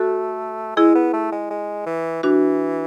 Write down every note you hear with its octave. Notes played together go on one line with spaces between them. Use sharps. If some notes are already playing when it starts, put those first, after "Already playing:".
Already playing: A3 F#4 A4
G#3 E4 G#4
B3
A3
G#3
G#3
E3
E3 D4 F#4